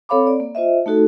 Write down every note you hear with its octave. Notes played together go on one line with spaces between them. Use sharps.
C4 A4 C#5 F5 B5 D6
D5
A#3
F4 C5 D#5 E5
A3 D#4 F#4 A4